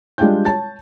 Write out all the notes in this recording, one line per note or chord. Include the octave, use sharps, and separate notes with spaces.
G3 G#3 D4 F4 G5 G6
C#5 A5 A6